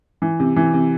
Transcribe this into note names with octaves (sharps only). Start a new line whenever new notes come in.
E3
C3
E3
C3